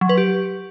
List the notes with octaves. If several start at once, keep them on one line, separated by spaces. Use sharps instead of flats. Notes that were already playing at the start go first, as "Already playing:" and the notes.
F#3
B4
G4